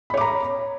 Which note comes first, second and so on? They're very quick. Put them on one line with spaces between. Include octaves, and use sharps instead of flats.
B5 C#5 D6 A#5